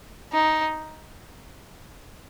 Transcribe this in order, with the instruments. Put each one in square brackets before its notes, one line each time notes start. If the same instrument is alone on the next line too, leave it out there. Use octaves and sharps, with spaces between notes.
[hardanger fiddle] D#4